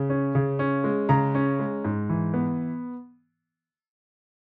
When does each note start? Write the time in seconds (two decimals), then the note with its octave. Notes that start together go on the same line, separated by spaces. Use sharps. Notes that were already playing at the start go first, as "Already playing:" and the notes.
Already playing: C#3
0.10 C#4
0.35 C#3
0.59 C#4
0.84 G#3
1.09 C#3 A#5
1.35 C#4
1.59 G#3
1.84 G#2
2.09 E3
2.34 B3